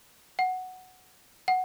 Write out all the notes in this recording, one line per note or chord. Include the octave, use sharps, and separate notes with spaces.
F#5
F#5